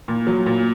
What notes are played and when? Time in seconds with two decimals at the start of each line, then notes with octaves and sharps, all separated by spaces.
0.08 A#2
0.27 F#3
0.46 A#2